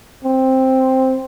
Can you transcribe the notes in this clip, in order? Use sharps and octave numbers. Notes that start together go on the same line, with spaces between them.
C4